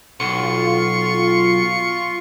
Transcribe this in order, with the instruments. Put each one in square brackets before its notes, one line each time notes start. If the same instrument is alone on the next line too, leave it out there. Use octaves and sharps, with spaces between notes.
[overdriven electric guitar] B1 [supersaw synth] F4 [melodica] C6 C#6 [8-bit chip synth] C#7